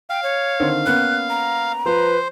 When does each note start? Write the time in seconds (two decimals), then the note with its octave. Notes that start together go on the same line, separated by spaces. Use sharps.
0.10 F5 G5
0.23 C#5
0.60 D3 D#3 C4
0.86 A#3 B3 C#4 F#6
1.30 A#5
1.86 F3 B4 C5